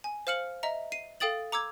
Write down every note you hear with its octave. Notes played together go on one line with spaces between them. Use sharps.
G#5
C5 F5 F6 C#7 F#7
D#5 E5 A#5
C7 D#7
A4 F5 G5 D#6 A6 F#7
A#5 D6 E6 G#6